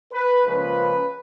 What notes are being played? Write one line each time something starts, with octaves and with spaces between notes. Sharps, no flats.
B4
C#2 C#3 F3 A#3 C#4 B4